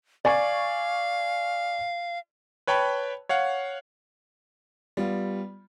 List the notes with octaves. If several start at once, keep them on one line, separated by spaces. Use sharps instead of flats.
D5 F5 G#5 C#6
B4 C#5 G5 A5 B5
C#5 F5 F#5
G3 B3 F4